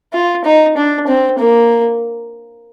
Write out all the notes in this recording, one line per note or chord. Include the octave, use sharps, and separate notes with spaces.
F4
D#4
D4
C4
A#3